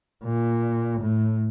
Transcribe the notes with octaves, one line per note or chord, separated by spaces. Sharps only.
A#2
A2